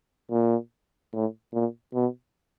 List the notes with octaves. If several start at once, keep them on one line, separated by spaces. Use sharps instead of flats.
A#2
A2
A#2
B2